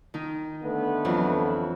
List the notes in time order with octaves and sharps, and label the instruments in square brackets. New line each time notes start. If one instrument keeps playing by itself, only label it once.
[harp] D#3 D#4
[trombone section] D3 A3 B3
[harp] F2 E3 F#3